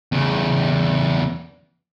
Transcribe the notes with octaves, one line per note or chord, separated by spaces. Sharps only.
E2 C#3